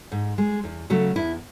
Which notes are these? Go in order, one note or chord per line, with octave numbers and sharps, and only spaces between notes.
G#2
G#3
E2
C#3 F#3 A3
E2 E4